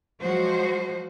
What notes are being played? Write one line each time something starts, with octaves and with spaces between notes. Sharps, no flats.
F3 F#3 G#3 F#4 C5